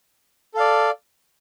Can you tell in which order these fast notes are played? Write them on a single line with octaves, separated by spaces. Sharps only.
A4 F5 D5